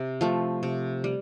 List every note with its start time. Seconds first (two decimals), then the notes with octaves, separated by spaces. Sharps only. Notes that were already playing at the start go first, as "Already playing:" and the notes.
Already playing: C3
0.21 F3 A3
0.63 C3
1.04 G3